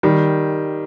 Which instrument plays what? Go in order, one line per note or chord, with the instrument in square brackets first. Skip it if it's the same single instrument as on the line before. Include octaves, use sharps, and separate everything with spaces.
[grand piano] D#3 G3